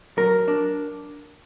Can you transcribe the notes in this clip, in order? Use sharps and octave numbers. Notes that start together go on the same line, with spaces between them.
F#3 A#4
D4